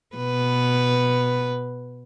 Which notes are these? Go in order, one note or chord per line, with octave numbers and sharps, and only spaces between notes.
B2 B4